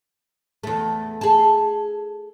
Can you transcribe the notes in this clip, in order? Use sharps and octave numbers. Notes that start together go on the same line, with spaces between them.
E2 A3
G#4 A4